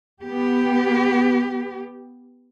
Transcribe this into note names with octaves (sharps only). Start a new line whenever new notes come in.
B3 G4